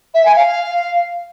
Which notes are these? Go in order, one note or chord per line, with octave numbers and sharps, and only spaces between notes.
E5
G#5
F5